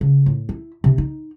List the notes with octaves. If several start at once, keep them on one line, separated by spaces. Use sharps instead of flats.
C#3
A2
E4
C3 D4
D#4